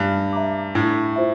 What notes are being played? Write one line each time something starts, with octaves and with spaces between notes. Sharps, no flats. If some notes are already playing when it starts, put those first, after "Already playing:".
Already playing: G2
E5 A#5 D6
A2 D4
F4 C5 E5